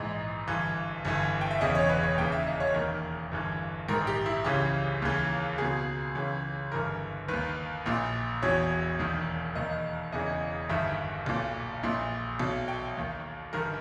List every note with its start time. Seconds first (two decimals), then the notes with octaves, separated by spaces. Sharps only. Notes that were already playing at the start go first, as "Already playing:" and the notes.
Already playing: A#1 G#2 E3 D#5
0.48 G1 G2 E3
1.05 G1 G2 E3
1.41 G5
1.51 E5
1.61 E1 E2 C#3 D#5
1.75 C#5
1.89 B4
2.03 C#5
2.18 D#2 C#3 E3 G5
2.32 E5
2.47 D#5
2.60 C#5
2.74 E1 D#2 D#3 A#4
3.31 G1 G2 E3
3.88 A#1 G#2 D#3 A#4
4.07 G4
4.26 E4
4.44 C#2 C#3 E3 G4
5.02 D#2 C#3 E3
5.58 C#2 B2 G#4
6.15 C#2 C#3 E3
6.72 G1 G2 E3 A#4
7.28 D#2 D#3 B4
7.86 A#1 A#2
8.42 E1 E2 B2 C#5
8.99 E1 D#2 D#3
9.55 E1 D#2 D#3 D#5
10.12 E1 E2 C#3 E3 D#5
10.69 G1 G2 D#3 E5
11.26 B1 A#2
11.83 A#1 A#2
12.40 B1 B2
12.68 G5
12.97 D#2 D#3
13.53 G1 G2 D#3 A#4